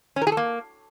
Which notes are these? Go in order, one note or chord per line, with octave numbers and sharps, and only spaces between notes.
C#4
A#4
G#4
A4
A#3